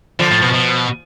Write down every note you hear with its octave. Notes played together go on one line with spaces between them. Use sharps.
D3 F3
A2
B2
B2